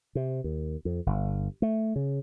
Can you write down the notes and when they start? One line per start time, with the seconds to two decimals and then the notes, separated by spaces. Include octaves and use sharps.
0.15 C3
0.44 D#2
0.85 F2
1.06 G1
1.62 A3
1.96 C#3